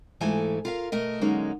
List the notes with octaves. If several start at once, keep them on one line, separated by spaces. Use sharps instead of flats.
G#2 E3 A3 F4 A4 G#5
F4 A#4 F5
B2 A3 A#4 D#5
D3 F#3 G#3 A#3 C#4 D#4